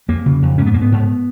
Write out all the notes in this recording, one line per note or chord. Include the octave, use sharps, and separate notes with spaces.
F2 A#3
C#3
F2
G#2 C#4
B3
G#2 A#3
B3
G#2